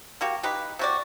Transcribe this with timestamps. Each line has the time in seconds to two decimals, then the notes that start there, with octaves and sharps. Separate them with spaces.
0.21 A#3 F#4 G4
0.43 D#4 G4 B4
0.79 C3 F#4 D5